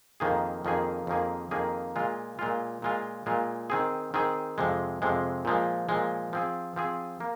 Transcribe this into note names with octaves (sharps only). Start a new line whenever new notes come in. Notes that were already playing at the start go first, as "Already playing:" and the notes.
F2 D#3 A#3 G#4
F2 D#3 A#3 G#4
F2 D#3 A#3 G#4
F2 D#3 A#3 G#4
A#2 G#3 F4
A#2 G#3 F4
A#2 G#3 F4
A#2 G#3 F4
D#3 C4 G#4
D#3 C4 G#4
F2 C3 G#3
F2 C3 G#3
A#2 F3 G#3
A#2 F3 G#3
F3 C4 G#4
F3 C4 G#4
A#3